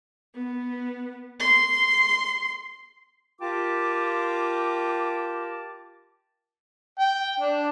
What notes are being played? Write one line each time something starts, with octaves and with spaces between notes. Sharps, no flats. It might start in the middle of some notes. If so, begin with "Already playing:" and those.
B3
C6
F4 G4 A#4 G5 A5 D6
G5
D4